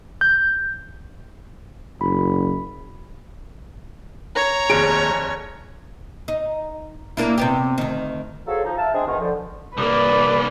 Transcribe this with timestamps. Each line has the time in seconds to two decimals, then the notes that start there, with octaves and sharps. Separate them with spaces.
0.21 G6
2.01 F#1 B5
4.36 C#5 A#5
4.70 F1 D#2 G#4 D7
6.28 D#4
7.17 A#3 D4 E4
7.38 C3 B3 G4
7.78 D2 D#3
8.47 F3 F#3 G#4 A4
8.64 F3 D#4
8.77 E5 F5 A5
8.94 G#3 C4 D4 G#4
9.07 G#2 B2 D#3
9.20 D3 F3
9.77 C2 A#3 B4 D5